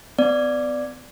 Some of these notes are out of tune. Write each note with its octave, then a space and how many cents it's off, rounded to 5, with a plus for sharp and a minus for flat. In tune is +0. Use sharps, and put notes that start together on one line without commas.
B3 +40 D5 +0